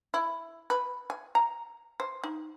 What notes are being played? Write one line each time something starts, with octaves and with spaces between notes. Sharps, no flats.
E4
B4
G#5
A#5
C5
D#4